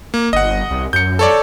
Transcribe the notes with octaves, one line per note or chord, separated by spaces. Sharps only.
A#3
G1 D#5 F#5
C2
F#2 G6 C#7
A4 C#5 D5